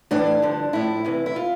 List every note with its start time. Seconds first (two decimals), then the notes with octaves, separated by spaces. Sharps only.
0.11 A2 E3 D4
0.42 G2 D3 F3
0.73 A2 F3 E4
1.05 E2 C3 E3
1.26 E4
1.36 F4